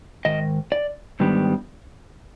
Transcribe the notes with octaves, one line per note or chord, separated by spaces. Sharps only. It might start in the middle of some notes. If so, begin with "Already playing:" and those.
G#2 D#3 D#5
D5
G#2 D#3 G3 B3 D4